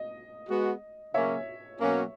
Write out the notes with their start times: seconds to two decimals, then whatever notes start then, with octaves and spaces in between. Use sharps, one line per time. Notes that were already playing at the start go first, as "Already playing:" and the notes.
Already playing: D#5
0.49 G#3 B3 F#4
1.14 C#3 F#3 A#3 C#4 C#5 E5
1.80 B2 F#3 A#3 C#4